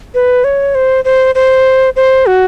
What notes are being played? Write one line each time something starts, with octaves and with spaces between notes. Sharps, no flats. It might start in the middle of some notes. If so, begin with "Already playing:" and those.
B4
C#5
C5
C5
C5
C5
F#4